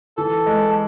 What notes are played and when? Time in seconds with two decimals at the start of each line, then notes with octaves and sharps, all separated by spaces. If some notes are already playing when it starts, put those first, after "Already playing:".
0.17 E3 A4
0.46 G#3